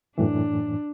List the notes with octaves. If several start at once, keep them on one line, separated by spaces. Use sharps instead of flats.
F#2 A2 E3 D4